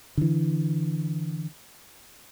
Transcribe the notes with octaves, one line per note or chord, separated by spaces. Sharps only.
D3 E3